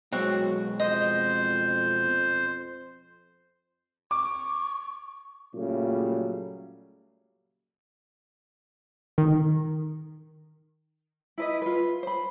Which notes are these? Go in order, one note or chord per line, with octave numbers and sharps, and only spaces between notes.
B2 F#3 G#3 C4 F#4
F2 C5 D#5
C#6 D6
A#2 C#3 F#3 G3 A3
D#3
E4 B4 D#5
F4 B4
C5 B5